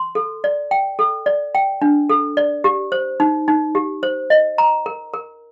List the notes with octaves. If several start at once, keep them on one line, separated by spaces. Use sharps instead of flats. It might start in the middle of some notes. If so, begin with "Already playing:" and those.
Already playing: C6
A4
D5
G5
A4
D5
G5
D4
A4
D5
G4
C5
D#4
D#4
G4
C5
D#5
A#5
A#4
A#4